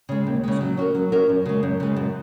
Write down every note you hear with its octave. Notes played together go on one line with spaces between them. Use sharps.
C#3 G#3
D#2
C#3 G#3
F#3
C#4 F#4 A#4
F#3
C#4 F#4 A#4
F#2
C#3 G#3
F#2
C#3 G#3
F#2